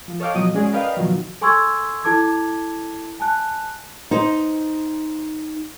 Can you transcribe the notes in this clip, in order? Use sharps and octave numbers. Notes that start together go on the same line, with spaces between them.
F3
A4 C#5 D#5 F5 G5 D6
B2 F3 F#3 D#5 D#6
G#3 C#4 F#4 G#4 D5
A#4 B4 D5 D#5 F5 G5
B2 D#3 F3 F#3
A4 G#5 C6 C#6 E6 G#6
E4 A4 A5 D6 G#6
G#5 A5 F#6
D#4 C5